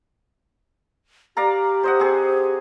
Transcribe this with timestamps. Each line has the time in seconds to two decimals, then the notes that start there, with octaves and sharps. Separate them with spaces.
1.37 G4 D5 F5 A#5
1.83 C5 D#5 F#5
2.00 C4 G#4